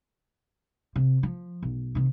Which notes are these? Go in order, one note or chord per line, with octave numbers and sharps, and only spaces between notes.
C3
F3
B1
C3 D#3